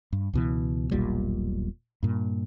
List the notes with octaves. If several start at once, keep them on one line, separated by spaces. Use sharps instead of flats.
G2
C#2 B2 E3
E1 B1 A#2 G3
G2 A#2